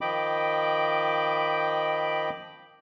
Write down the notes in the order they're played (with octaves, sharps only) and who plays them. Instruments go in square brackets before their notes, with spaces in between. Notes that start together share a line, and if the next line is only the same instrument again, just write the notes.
[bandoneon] D#3 F3 D#5 G5 B5 D6